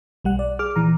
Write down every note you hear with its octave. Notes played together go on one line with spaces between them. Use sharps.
B1 G3 F#5
D5
G#4 D6 F6
A#2 E3 A#5